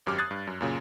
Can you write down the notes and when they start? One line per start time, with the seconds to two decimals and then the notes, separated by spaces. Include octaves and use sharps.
0.06 G#1 F#2 G4 D6 F6
0.18 D#6 F#6 G#6 A6 C7
0.31 G2
0.47 F#2
0.61 F#2 A#2 C#3